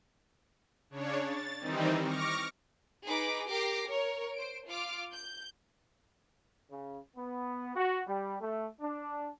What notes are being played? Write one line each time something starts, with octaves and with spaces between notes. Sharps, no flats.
C#3 D4 C#5
A6
D#3 E3 G3 C4 D#4
C#6 D6 F6 A#6
D#4 G#4 B4 D6 A#6 B6
G4 A#4 D6 A#6 C7 D7
A#4 C#5
C5 D7
F4 D6 F6
G6
C#3
B3
F#4
G3
A3
D4